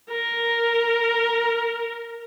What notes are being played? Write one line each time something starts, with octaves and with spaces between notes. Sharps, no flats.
A#4